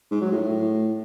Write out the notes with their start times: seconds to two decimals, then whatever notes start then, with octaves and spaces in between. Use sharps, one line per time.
0.11 G#2
0.21 F#3
0.31 A2
0.41 A2